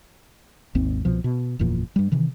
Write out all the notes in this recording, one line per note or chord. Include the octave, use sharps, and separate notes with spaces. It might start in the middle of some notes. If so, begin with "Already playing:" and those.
G#1 D#2 C4
C2 B2 F3
B2
F#1 E2 A#2 F3
G2 G3
C3 D#3 E3